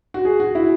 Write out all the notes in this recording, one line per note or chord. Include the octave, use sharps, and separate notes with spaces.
F#4
G#4
F#4
E4